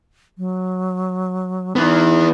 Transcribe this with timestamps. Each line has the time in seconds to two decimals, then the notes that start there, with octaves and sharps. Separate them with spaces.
0.38 F#3
1.76 E3 B3 D#4